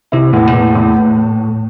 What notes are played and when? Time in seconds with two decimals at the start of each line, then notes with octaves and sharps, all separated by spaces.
0.12 C3 E4
0.33 E2 A2
0.47 A#2
0.54 E2
0.61 A2
0.75 E2